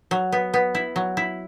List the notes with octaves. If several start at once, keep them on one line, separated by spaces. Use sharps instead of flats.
F#3
B3
B3
E4
F#3
E4